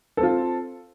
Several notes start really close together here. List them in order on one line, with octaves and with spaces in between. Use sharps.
A4 C4 F4